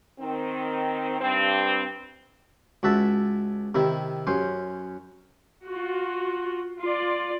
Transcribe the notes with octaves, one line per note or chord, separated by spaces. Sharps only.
D#3 C4
G2 C4
C#2 F#4 E5 A5
C3 D#3 E4
F#2 C#4 C5
F4 F#4
F4 D5